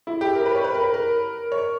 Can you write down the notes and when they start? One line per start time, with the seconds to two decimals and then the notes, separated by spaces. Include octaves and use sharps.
0.07 E4
0.21 G4
0.35 A#4
0.46 B4
0.55 C#5
0.64 B4
0.74 A#4
0.84 B4
0.94 A#4
1.52 C#5